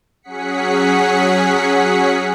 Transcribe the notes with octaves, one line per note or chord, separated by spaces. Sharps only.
F#3 C#4 G#4 F#5 B6 C#7